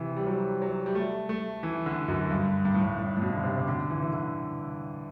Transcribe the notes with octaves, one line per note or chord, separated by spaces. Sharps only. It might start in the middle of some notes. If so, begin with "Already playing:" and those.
Already playing: C3 E3
G3
F#3
F#3
G3
A3
A3
E3
D3
F#2
G2
G2
A2
G2
A2
A2
B2
D3
C3
C3
D3
E3
E3
D3